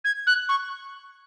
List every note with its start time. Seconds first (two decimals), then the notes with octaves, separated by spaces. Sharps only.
0.05 G#6
0.27 F#6
0.49 C#6